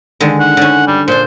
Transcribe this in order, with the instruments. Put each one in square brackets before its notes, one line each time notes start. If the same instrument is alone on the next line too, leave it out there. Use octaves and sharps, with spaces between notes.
[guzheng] D3 D#3 G#3
[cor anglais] F#5
[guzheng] D3 C#4
[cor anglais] G3
[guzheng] A#2 D4 [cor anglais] C5